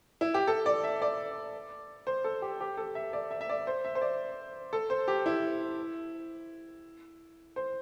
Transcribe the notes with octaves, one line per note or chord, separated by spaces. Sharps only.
E4
G4
A4
D5
E5
D5
C5
A4
G4
G4
A4
E5
D5
E5
E5
D5
C5
E5
C5
D5
A4
C5
G4
E4
C5